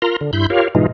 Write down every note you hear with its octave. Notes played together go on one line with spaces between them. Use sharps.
F4 A#4 A#5 C6
D3
G2 E4 B5 C6 G6
F4 G4 A#4 C#5 F5
G#2 B2 E3 G#3 D#4 F4